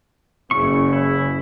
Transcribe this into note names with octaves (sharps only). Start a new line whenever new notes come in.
F#1 C#3 C#4 E4 C#6
E4